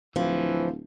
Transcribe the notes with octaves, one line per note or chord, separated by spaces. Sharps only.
D1 E3 F3